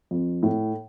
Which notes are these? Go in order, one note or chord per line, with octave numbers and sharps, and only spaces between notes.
F2
A2